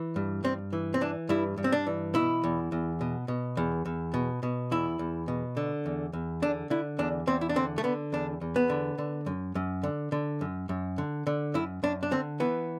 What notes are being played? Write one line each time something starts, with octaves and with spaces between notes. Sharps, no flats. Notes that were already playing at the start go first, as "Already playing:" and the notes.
Already playing: E3
G2
G2 C4
E3
C4
E3 D4
G2 E4
G2
C4
D4
E3
B2 E4
E2
E2
B2
B2
E2
E2
B2
B2
E2 E4
E2
B2
D3
E2
E2
D3 D4
D3 E4
E2 D4
E2 C4
E4
D4
D3 C4
A3
D3 B3
E2 D4
E2
B3
D3
D3
F#2
F#2
D3
D3
F#2
F#2
D3
D3
F#2 E4
F#2 D4
D4
D3 C4
E3 B3